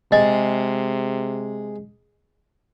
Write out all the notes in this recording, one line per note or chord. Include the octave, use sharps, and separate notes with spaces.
C3 G#3 D#5